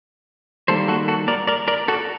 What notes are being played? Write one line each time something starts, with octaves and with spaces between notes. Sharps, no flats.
D#3 G3 A#3 A4 C5
F#4 A4
F#4 A4
A#4 D5
A#4 D5
A#4 D5
F#4 A4